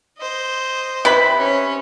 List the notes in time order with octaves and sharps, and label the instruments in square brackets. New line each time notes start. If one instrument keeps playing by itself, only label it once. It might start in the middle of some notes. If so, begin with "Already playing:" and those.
[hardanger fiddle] C5 D#5
[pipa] C3 B4 B5
[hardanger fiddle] C#4 C#5